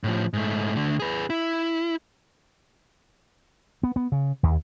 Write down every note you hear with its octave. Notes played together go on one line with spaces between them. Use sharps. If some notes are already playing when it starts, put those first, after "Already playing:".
A2 F3
G#2 A3
D3 A3
G#4 B4
E4
B3
B3
C#3
D#2